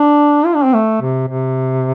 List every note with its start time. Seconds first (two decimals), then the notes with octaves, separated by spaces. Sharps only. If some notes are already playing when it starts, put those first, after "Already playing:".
Already playing: D4
0.46 F4
0.55 D4
0.64 C4
0.74 A3
1.01 C3
1.28 C3